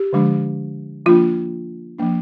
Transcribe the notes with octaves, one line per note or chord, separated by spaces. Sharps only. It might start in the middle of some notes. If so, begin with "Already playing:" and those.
Already playing: G4
D3 F3 G#3 D4
F3 A#3 D4 F4
F3 A#3 D4